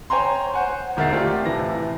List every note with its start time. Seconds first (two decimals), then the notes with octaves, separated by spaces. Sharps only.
0.10 C5 C#5 G5 G#5 A#5 C6
0.54 C5 F#5 G#5
0.97 E1 D#3 E5 F#5 A6 C7
1.11 A3 C4 F4 G4 D5
1.46 A2 C3 E3 A5 A#6